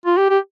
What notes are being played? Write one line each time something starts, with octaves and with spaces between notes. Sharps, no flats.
F4
G4
G4